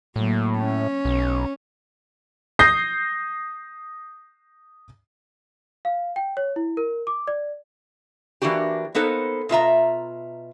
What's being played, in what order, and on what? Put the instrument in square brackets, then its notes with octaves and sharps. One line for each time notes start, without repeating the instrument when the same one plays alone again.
[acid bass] A2 [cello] F#3 A#3
[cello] C#4
[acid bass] B1
[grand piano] D#6 G6 A#6 C7
[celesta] F5
G5
C#5
E4
A#4
D6
D5
[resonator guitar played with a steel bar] E3 A#3 D4 F#4 G4
A#3 B3 D#4 A4 C5
B2 F4 E5 A#5